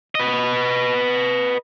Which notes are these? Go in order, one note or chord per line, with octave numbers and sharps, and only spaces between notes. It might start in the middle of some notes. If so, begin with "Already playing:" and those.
B4 D#5